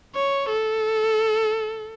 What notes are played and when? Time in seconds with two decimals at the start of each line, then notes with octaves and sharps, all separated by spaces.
0.15 C#5
0.49 A4